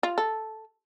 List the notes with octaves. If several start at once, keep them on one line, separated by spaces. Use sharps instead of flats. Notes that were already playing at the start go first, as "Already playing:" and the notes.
F4
A4